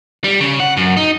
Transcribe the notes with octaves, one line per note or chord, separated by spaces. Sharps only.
G3
C#3
F#5
F#2
D#4